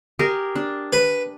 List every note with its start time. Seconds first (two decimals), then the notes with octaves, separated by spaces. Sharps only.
0.19 G4 G#4 A#4
0.55 D4
0.93 B4